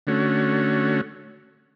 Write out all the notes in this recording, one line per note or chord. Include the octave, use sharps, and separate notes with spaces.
D3 A3 C#4 F#4